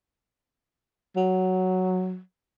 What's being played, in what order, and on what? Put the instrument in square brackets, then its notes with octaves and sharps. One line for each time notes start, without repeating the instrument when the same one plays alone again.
[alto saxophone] F#3